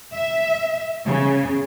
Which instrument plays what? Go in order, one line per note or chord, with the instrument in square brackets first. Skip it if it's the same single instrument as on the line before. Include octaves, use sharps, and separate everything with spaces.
[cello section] E5
C#3